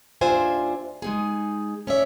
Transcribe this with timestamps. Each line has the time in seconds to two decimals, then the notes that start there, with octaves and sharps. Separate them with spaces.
0.21 D#2 D4 F4 C5 E5 G#5
1.02 G#3 D#4 G#4
1.87 C#4 C#5 D5 E5